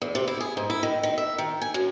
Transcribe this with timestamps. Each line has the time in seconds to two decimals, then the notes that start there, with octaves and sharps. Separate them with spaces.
0.02 E2
0.15 C3
0.27 E4
0.40 G#4
0.57 G#2
0.70 E4
0.83 D#3
1.03 D#3
1.18 E5
1.38 D#3
1.61 G#5
1.74 F#2